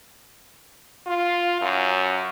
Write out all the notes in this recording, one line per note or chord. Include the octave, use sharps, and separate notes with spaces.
F4
F#2